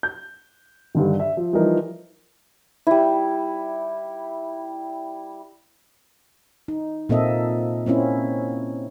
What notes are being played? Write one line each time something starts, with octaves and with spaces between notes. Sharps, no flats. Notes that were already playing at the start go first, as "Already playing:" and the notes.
G6
G2 D3 D#3
E5
F3
E3 F3 G3 D#4 A#4
G3 E4
D#4
A#2 A#3 C4 A4 D#5 E5
A#3 C4 C#4 E4